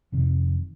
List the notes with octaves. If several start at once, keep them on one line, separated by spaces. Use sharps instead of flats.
F1 F2 C3 D#3